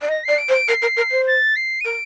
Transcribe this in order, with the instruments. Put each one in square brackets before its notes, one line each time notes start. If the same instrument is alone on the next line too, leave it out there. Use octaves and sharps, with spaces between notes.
[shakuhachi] D5
[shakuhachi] D#5 [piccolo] A#6
[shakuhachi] D5 [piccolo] C7
[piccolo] D7
[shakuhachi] C5
[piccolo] D7
[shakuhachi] A#4 [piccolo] C7
[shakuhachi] A#4
A#4
C5
[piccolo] A6
C7
D#7
[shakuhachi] A#4 [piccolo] D7